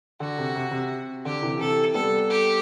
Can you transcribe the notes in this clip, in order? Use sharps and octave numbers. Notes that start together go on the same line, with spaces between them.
D3 F#4
C3
C3
C3
D3 G4
C3 E3
C3 E3 A4
G3 B3 A4
G4